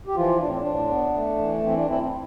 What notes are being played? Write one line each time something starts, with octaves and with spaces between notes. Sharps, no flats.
G4
E3 F3 F4
A2 D4
C4
D4
A2
B3
A3
E3
E3 C4
D4
E3 C4 E4
C4